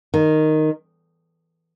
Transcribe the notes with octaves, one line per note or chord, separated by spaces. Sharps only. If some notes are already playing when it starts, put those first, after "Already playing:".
D#3